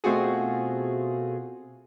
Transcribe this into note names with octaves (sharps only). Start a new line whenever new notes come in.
B2 A3 C4 F4 F#4 G#4